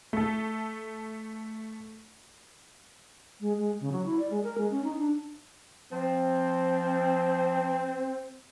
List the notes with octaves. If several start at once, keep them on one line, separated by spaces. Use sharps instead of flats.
A3 A4
G#3
G#3
C#3
F#3
E4
D5
G#3
A#4
G#3
C#4
D#4
D4
F3 C4